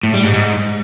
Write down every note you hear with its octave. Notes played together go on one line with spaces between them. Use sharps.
A2
G3
G#2
G#2